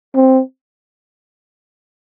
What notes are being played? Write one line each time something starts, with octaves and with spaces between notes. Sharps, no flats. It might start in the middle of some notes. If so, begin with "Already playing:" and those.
C4